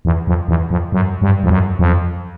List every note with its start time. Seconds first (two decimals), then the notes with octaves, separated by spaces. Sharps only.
0.05 E2
0.27 F2
0.48 E2
0.71 F2
0.92 F#2
1.22 G2
1.44 F2
1.50 F#2
1.79 F2